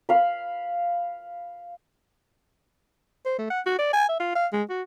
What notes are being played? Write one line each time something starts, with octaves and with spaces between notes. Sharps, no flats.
F5 B5
C5
A3
F#5
F#4
D5
G#5
E5
F4
F5
G#3
F#4